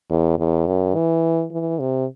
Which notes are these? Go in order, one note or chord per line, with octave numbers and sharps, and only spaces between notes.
E2
E2
F#2
E3
E3
C3